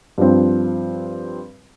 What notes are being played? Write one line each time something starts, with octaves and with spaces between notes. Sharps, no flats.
G2 F3 C4